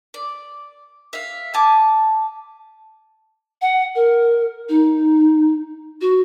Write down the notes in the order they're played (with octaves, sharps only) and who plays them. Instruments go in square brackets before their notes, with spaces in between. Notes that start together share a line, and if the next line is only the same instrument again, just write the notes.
[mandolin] D5
E5 F5
G#5 A5 D6
[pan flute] F#5
A#4
D#4
F#4